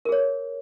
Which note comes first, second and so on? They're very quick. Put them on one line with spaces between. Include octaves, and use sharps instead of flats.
A#4 G#4 C#5